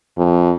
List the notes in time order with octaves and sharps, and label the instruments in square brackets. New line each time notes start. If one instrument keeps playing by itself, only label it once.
[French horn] F2